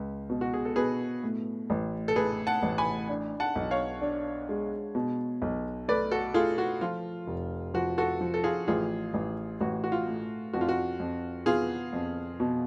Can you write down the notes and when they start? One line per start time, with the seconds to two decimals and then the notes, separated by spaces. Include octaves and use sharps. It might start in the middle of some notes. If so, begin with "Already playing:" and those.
Already playing: C#2
0.30 B2
0.41 F#4
0.54 G#4
0.65 A4
0.76 B2 G#4 B4
1.23 A2
1.70 A1
2.08 A4
2.16 A2 G#4 B4
2.47 F#5 A5
2.62 A1
2.78 G#5 B5
3.09 D4
3.40 F#5 A5
3.56 B1
3.71 C#5 F5
4.01 D4
4.49 G#3
4.95 B2
5.42 B1
5.88 A3 B4 D5
6.11 F#4 A4
6.34 A3 F4 G#4
6.58 F#4
6.81 F3 F4
7.27 F1
7.74 F3 F#4
7.98 F#4 A4
8.21 F3
8.34 A4
8.44 F4 G#4
8.67 A1 F4 G#4
9.14 A1
9.60 A1 F#4
9.84 F#4
9.92 F4
10.07 A2
10.53 F2 F#4
10.61 F4
10.69 F#4
11.00 F2
11.46 B3 F4 G#4
11.93 F2
12.40 B2